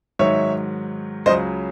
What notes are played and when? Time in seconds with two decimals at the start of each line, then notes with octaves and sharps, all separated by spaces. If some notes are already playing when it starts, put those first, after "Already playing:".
0.19 G#2 D#3 F#3 C#5 E5
1.26 C#2 C#3 F#3 C5 D#5